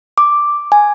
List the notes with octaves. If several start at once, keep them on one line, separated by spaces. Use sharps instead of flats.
D6
G#5